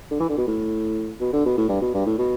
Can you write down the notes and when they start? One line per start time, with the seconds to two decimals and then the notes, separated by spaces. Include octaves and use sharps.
0.11 D3
0.20 E3
0.29 D3
0.38 B2
0.47 A2
1.20 B2
1.33 D3
1.45 B2
1.57 A2
1.69 G2
1.82 B2
1.94 G2
2.06 A2
2.18 B2